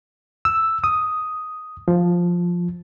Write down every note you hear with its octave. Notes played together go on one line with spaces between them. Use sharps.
E6
D#6
F3